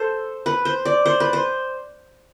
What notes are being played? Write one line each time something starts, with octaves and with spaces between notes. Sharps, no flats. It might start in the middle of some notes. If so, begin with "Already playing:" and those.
Already playing: A4 C5
B4
C5
D5
C5
B4
C5